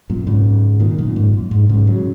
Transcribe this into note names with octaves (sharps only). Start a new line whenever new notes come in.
F#2 A#2
G#2 C#3
A#2 D#3
F#2 A#2
G#2
F#2
G#2
G#2 C#3
C#3 F#3